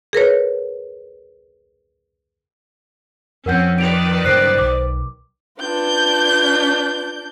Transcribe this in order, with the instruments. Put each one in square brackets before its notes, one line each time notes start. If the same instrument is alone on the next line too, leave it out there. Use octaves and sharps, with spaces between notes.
[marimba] G#4 A#4 B4 C#5
[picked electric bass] F2 F3 [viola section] C4 C#4 [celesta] A#4 F#5 G6
[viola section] D#3 B4 D5 [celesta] D7 F7
[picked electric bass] G2 C#3 F#3 [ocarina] C5 [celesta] F#6 C7 D7
[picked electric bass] B1 [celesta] D6
[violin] D4 G6 [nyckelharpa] F4 B4